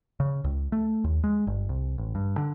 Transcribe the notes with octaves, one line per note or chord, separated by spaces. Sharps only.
C#3
C#2
A3
D#2
G#3
G1
C2
A1
G2
D3